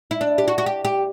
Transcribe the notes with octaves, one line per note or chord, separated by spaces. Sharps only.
E4
D4
G4
F#4
F#4
G4
G4